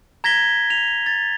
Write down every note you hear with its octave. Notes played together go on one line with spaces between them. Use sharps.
A#5 G#6 A#6 B6 G7
F7
A6